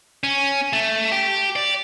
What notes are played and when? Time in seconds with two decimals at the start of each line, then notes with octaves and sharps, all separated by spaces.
0.24 C#4
0.73 A3
1.12 G4
1.56 D5